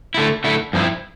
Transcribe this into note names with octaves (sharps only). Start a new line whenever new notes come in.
D3 A3 E4
D3 A3 E4
G2 F3 C4 E4